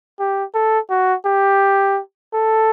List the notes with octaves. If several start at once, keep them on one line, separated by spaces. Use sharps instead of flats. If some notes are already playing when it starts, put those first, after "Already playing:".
G4
A4
F#4
G4
A4